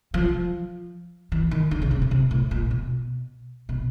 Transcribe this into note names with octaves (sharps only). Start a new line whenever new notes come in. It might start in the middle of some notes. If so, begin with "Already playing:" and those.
F3
E3
D#3
D3
C#3
C3
C#3
C3
A2
A#2
B2
B2